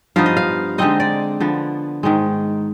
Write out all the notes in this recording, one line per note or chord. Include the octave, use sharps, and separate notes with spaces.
G2 F3 B3 D#4 F5
D#5
F5
D3 G#3 C4 D#4 D#5
D5
D3 F3 B3
G#2 D#3 G#3